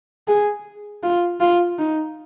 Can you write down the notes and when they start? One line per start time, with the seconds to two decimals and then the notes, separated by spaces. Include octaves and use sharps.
0.28 G#4
1.03 F4
1.40 F4
1.79 D#4